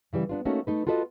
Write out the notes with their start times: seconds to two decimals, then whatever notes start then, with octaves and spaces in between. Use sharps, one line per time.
0.13 C#3 E3 G3
0.29 B3 D4 F4
0.45 A3 A#3 C#4 D#4 F#4 A4
0.67 A3 D#4 B4
0.87 F4 F#4 A4 B4 D#5